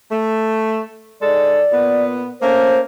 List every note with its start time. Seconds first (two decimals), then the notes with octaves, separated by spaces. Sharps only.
0.09 A3
1.22 G#2 G#3 A4 D5
1.72 A#2 B3
2.41 A3 A#3 C#4 C5